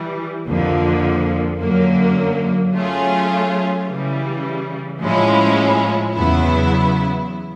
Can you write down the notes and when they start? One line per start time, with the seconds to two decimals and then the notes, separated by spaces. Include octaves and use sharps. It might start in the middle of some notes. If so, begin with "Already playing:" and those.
Already playing: E3 G3
0.47 F2 D3 F3 A#3
1.60 F#2 D3 F#3 A#3
2.74 F#3 A3 C#4 F4 G#4
3.87 C#3 E3 G3
5.01 A2 F3 G#3 C#4 E4
6.14 E2 C#3 F#3 B3 E4